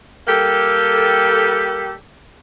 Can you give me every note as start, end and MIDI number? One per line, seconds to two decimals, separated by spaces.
0.28 1.91 55
0.28 1.91 58
0.28 1.91 67
0.28 1.91 69